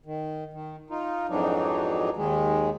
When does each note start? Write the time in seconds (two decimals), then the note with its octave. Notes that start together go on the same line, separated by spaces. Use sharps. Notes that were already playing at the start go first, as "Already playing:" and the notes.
0.06 D#3
0.53 D#3
0.90 D#4 F4
1.29 F2 G#2 E3 F#3 D4 D#4
2.16 D#2 D#3 G#3